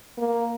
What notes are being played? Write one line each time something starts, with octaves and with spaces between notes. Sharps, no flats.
A#3